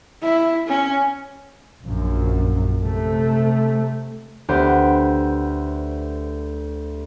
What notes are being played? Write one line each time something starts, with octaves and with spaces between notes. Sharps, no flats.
E4
C#4
A#1 F#2
C3 A3
D2 B3 G4 C5